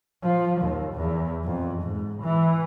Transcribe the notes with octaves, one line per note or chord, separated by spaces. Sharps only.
F3
D#2
E2
F2
G#2
E3